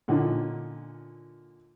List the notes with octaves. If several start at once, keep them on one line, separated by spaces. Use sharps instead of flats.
A#2 D3 C#4 D#4